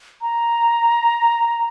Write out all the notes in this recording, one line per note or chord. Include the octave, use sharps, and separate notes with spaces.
A#5